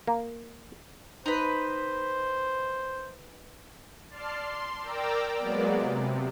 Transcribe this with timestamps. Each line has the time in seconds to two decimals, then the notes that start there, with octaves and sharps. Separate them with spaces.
0.07 A#3
1.26 D#4 B4 C5
4.09 D5 A5 C6 F6 C7
4.40 C6
4.80 A#4 D5 G5 A#5 D6 E6
5.38 F#3 G#3 A#3 B3 D5
5.77 C3